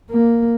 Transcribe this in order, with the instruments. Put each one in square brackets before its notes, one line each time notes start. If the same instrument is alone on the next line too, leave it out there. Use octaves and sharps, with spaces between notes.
[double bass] A#3